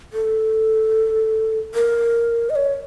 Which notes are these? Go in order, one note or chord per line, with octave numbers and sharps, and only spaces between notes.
A4
A#4
D#5
C#5